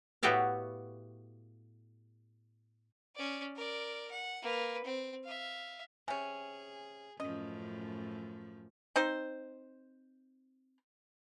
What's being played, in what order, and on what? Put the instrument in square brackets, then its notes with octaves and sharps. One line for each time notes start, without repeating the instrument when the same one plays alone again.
[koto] A2 B3 F#4 G4 E5 F5
[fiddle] C#4 D5
A#4 D5
F#5
A#3 B4
C4
E5 F5
[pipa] C3 C#4 [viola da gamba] G#4 [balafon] G#5
[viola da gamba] F#2 A2 F3 [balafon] C#4 [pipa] D#5
[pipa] C4 D#4 C5